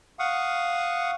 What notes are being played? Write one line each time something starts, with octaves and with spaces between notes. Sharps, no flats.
F5 F#5 C#6 D#6